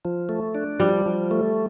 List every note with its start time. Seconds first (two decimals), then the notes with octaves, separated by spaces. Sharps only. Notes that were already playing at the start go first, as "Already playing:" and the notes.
0.05 F3
0.29 A3
0.55 D4
0.79 F3 G3
1.06 F3
1.31 A3